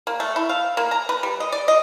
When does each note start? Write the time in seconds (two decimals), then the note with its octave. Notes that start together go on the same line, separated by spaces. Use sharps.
0.07 A#3
0.20 A3
0.36 E4
0.49 F5
0.77 A#3
0.91 A#5
1.09 B4
1.23 G3
1.40 D#5
1.52 D5
1.68 D#5